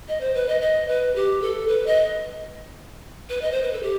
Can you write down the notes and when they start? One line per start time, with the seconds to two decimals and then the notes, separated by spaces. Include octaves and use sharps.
0.08 D#5
0.21 C5
0.35 B4
0.49 D#5
0.61 D#5
0.88 B4
1.16 G4
1.42 A4
1.68 B4
1.87 D#5
3.29 B4
3.42 D#5
3.52 C5
3.62 B4
3.73 A4
3.83 G4